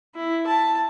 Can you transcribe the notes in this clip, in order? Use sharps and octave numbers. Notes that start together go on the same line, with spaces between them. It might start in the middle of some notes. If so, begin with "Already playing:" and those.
E4
A5